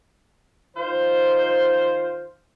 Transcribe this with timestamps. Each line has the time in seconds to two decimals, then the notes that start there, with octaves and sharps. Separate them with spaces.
0.75 D#3 F4 C5